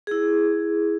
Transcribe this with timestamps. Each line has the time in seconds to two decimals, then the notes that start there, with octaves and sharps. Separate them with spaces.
0.07 E4 G#4